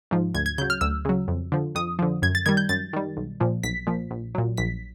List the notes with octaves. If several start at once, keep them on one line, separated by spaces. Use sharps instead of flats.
G#2 F3
D2 G#6
G#6
C#3 F#3 G6
F6
D2 E6
C#3 F#3
F2
D3 F3
F2 D#6
D3 F3
F#2 G#6
A6
D#3 G3 G#6
G6
F#2 A6
D#3 G3
B1
A#2 F3
B1 B6
A#2 F3
A#1
A#2 F#3
A#1 B6